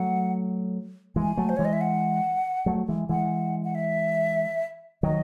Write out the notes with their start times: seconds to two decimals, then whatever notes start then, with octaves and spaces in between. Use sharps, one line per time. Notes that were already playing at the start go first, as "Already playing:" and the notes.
Already playing: F#3 A3 F#5
1.16 E3 G#3 G#5
1.37 F#3 A3
1.49 C5
1.56 E3 G#3 C#5
1.65 D#5
1.73 E5
1.81 F#5
2.66 F#3 A3
2.88 E3 G#3
3.09 E3 G#3 F#5
3.64 F#5
3.75 E5
5.03 D#3 F#3 D#5